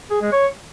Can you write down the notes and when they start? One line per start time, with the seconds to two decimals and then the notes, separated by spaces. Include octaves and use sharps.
0.10 G#4
0.21 G#3
0.32 C#5